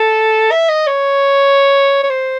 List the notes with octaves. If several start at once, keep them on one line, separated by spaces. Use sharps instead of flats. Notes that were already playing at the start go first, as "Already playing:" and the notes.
Already playing: A4
E5
D#5
C#5
C#5
C5